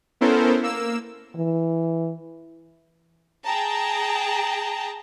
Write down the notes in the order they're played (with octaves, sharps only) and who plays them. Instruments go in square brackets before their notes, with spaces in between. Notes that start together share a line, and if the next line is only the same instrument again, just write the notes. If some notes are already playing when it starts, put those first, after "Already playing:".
[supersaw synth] B3 C#4 E4 A4 A#4 C5
A#3 E6
[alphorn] E3
[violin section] G#4 G5 A5 A#5